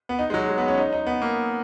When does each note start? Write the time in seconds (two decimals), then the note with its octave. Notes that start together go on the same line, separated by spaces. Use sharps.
0.09 B3
0.19 D#4
0.30 G#3
0.34 F#3
0.49 G#3
0.58 B3
0.68 C#4
0.78 D#4
0.93 D#4
1.06 B3
1.22 A#3